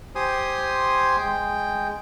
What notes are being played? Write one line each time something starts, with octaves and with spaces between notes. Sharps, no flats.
G4 C5 G#5 C6 D#6
G#3 G5